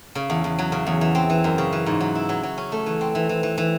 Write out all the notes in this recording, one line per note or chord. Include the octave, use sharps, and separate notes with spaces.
C#3
E2
E2
F#3
C#3
E2
E3
C4
E3
F#2
C#3
E3
G#2
F#3
E4
F#3
F#3
C#4
A3
E3
C4
E3
E3
E3
E3